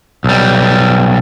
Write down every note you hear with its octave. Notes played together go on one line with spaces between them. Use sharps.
B1 G3